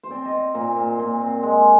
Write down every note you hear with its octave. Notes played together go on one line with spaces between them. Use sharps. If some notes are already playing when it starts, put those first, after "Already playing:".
C5
C4 D5
D#5
C4
A#2
A#2
A#2
C4
G#3